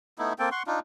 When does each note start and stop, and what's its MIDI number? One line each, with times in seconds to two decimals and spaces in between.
0.19 0.33 57
0.19 0.33 59
0.19 0.33 63
0.19 0.33 64
0.39 0.49 58
0.39 0.49 60
0.39 0.49 69
0.39 0.49 79
0.52 0.63 78
0.52 0.63 84
0.52 0.63 85
0.67 0.80 62
0.67 0.80 63
0.67 0.80 65